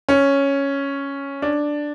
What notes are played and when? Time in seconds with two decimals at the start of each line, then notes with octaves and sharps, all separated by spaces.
0.09 C#4
1.42 D4